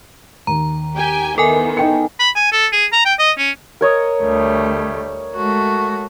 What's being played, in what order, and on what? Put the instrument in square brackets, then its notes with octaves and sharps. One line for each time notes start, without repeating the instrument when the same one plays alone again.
[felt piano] D#2 [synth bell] A#5
[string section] G4 G5 G#5
[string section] D#3 E3 B3 [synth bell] A4 A#4 G#5
[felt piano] D#4 G5 C#7
[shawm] B5
G#5
A4
G#4
A#5
G5
D#5
C#4
[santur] A#4 C#5 D#5
[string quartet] D2 G3 A3
G#3 A3 F#4